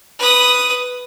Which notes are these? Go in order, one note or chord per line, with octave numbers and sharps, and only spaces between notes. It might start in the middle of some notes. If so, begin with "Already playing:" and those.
B4 D#6